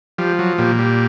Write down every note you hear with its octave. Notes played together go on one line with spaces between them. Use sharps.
F3 G3
F#3
A#2 G3
G3